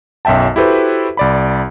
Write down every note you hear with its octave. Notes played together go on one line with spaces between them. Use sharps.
B1 F#2 E5 G5 A5
E4 F#4 G4 A4 B4 C5
C2 D5 B5